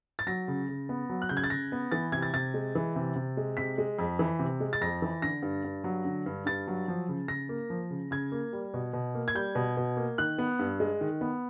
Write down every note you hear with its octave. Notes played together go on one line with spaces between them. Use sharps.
A6
F#3 A#6
C#3
C#3
B3
F#3
F#6
C#3 G6
G#6
A6
C#3 A#6
B3
E3 A6
C3 G#6
A6
C3 A6
G#3
E3
C3
C3
G#3
C3 B6
G#3
F2
E3
C3
G#3
A6
F2 A#6
E3
D3 A#6
G2
G2
F#3
D3
G2
G2 A6
F#3
F3
C#3
C#3 A#6
A#3
F3
C#3
C#3 G#6
A#3
G3
B2
B2
A#3
G#6
G3 G6
B2
B2
A#3
D#3 F#6
B3
G2
G#3
D#3
B3